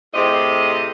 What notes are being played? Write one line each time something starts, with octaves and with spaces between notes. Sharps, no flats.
A2 C3 C4 G4 G#4 D#5